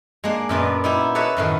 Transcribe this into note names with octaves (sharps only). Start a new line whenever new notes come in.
G#3 A#3 D4
F#2 A#2 B3 D4
D#4 E4 G4
A4 B4 C#5 D#5 E5 F#5
F#2 A2 D#3